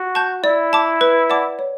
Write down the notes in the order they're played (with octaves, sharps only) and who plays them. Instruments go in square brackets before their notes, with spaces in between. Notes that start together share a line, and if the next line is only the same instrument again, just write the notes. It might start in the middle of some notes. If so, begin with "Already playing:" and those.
Already playing: [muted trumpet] F#4
[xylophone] A5 C#6 G6
[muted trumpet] E4 [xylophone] D5
[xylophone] A5 D6
B4
D5 F#5 A5 D6
C#5